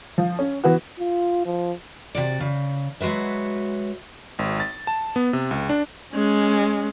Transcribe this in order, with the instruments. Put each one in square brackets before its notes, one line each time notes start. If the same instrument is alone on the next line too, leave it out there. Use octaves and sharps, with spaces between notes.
[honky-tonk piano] F3
C#4
E3 B3 F#4
[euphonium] F4
F3
[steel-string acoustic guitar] C3 F#4 D5
C#3
F#3 G#3 F#4 B4 E5
[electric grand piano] G#1
A6
A5
B3
C3
C#2
D4
[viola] G#3 C#4